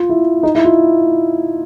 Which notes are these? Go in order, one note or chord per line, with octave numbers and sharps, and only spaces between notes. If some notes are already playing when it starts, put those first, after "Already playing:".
Already playing: F4
E4
D#4
E4
F4